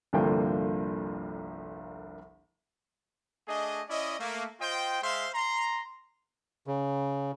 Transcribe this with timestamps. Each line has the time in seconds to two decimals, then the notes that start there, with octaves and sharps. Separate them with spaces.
0.13 G1 C2 D3 F3 A#3 G5
3.48 A3 D4 G#4 D#5
3.89 C#4 E4 D5 D#5
4.19 A3 A#3
4.60 F4 C5 D#5 G5
5.03 G#3 C5 E5 F5 C6
5.34 A#5 C6
6.67 C#3